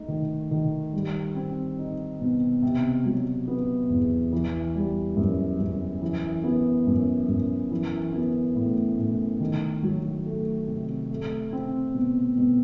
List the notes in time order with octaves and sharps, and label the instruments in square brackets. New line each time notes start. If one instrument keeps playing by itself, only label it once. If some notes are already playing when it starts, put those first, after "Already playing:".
Already playing: [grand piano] A3 D#4
D#3
D#3
G3
C4
D#4
B2
C3
F#3
B3
E2
E3
G3
F#2
F#2
E3
B3
F#2
F#2
E3
B3
A2
A2
D#3
F#3
A3
C3
A3
C4
B2
B2